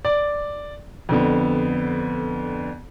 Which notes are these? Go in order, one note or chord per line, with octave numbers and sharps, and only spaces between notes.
D5
F2 D3 B3